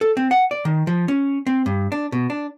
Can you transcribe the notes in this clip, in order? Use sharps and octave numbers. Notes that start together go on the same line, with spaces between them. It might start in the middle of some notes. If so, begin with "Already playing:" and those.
A4
C4
F#5
D5
D#3
F3
C#4
C4
G2
D4
B2
D4